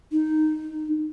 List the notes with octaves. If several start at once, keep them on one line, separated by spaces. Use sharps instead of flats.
D#4